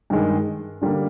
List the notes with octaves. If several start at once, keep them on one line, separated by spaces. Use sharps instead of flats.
G2 D#3 G#3
D3 G3 A#3